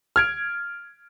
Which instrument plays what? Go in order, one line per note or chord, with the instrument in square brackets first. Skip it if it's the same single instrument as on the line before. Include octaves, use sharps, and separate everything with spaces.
[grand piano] F6 G#6 D7